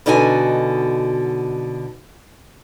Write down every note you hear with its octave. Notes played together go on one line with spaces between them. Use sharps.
B2 D3 D#4 F#4 G#5